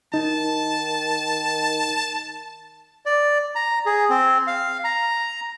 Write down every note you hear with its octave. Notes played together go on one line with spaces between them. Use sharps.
D#3 D#4 A5
D5
A#5
G#4
C4
F5
A#5